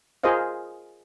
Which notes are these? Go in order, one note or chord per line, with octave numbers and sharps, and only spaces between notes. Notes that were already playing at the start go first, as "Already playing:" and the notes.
F4 G#4 A#4 C5 D#5 F5